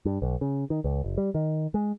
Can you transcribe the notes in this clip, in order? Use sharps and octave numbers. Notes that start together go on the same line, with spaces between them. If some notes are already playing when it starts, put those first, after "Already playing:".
G2
B1
C#3
D#3
C#2
F#1
G3
D#3
G#3